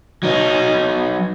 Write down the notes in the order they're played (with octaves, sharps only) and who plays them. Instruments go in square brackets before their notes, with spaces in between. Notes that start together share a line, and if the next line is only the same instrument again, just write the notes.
[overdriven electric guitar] F#3 D#4